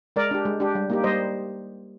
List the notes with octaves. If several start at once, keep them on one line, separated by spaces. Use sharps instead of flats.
G#3 A#4 D5
D4 G4
G#3
D4 G4
G3
A#3 D#4 G4
G3 C5 D#5